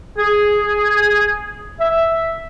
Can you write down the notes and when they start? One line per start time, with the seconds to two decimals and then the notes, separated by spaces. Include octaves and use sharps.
0.18 G#4
1.80 E5